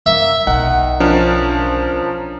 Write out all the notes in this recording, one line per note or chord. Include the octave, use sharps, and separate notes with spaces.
A#3 E5
B1 D#3 F#5
F3 C#4 D4 A#4